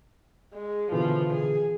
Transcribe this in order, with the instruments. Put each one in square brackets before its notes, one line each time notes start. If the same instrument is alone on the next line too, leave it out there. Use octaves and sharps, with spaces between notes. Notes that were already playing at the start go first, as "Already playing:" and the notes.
[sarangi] G#3
[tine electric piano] B2 D3 E3 [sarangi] F3
[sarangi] G#4